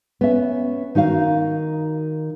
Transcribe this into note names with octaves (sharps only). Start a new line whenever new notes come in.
B3 C#4 E5
D#3 D#4 F#4 F5